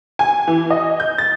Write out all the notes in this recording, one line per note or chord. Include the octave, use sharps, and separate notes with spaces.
G#5
E3
D#5
G6
A6